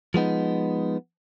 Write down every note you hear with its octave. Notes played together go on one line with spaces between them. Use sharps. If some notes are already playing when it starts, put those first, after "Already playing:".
F3 G#3 B3 D#4